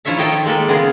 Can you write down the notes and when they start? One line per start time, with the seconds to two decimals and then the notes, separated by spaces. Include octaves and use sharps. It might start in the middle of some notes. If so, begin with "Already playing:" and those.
0.05 F3 E4 F4 C#5 E5 A#5
0.19 D#3 A4 C#5 D#5 G5
0.45 G#3 A#3 A4 B4
0.68 C#3 B3 F4 G#4 A#4